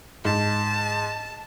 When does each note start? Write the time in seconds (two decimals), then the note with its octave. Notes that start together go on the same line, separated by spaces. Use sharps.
0.25 G#2 A5